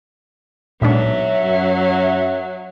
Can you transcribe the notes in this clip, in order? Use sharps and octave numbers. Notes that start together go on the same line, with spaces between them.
B1 A#2 F#3 G#3 D4 E5
F#2